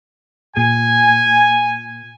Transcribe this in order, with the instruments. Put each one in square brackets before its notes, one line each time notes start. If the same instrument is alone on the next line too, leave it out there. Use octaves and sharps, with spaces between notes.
[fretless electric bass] A#2 [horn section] G#5